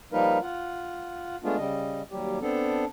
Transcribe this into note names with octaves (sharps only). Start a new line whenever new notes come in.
F3 G3 A#3 D#4 A#4 B4
F4 F#5
G#3 A3 B3 D4 F4
C#3 G3 D#5
D#2 F#3 G3 G4
B3 C4 D4 A4